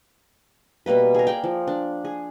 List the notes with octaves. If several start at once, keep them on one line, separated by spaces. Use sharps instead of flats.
B2 G3 A#3 B4
G#4 A#4
G#4 D5 G5
F3
D4
G#4